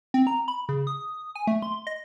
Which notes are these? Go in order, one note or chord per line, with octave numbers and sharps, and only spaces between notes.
C4
A#5
B5
C#3
D#6
G#5
A3
C6
D#5